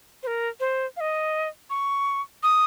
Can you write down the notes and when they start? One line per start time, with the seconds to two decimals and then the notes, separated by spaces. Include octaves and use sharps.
0.23 C5
0.27 A#4
0.60 C5
0.97 F5
1.01 D#5
1.70 C#6
2.43 D#6